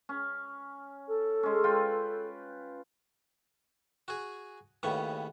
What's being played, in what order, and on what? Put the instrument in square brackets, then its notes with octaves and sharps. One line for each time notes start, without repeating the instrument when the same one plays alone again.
[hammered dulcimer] C#4
[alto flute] A4
[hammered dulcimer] G#3 C#4
F4 B4 G5
[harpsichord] F#4 G#4
D#2 A2 C#3 B3 C#6